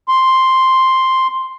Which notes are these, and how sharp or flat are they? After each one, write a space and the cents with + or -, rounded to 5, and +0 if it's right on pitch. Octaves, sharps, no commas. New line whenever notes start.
C6 +0